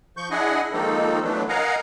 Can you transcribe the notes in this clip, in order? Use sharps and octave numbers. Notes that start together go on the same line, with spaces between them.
F3 C#6 G6
D4 E4 G#4 D#5 F#5 G#5
D#3 F3 G#3 A#3 D#4 A4
E3 F#3 A3 B3 D4
A#4 D#5 F5 F#5 G#5 A#5